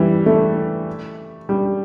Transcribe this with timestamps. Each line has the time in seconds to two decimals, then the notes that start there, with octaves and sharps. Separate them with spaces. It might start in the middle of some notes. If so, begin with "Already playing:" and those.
Already playing: E3 G3
0.26 A3
1.49 G3